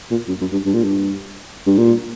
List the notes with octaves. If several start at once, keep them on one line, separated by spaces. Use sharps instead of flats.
A#2
F#2
F#2
G2
G2
A#2
G2
G2
A#2